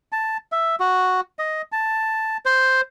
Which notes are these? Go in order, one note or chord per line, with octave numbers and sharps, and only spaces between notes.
A5
E5
F#4
D#5
A5
C5